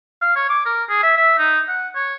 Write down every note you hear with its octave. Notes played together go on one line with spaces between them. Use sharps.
F5
C#5
D6
A#4
G#4
E5
E5
D#4
F#5
C#5